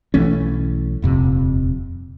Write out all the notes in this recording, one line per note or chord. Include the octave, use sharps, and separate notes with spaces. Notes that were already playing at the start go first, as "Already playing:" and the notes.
B1 E3 A3 C#4
D#1 F2 C3